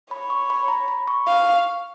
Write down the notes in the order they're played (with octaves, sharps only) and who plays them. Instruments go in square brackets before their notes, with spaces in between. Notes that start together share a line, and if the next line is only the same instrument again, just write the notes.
[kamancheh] C#5 [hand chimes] B5
[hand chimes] C#6
B5
A#5
B5
C#6
[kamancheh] F5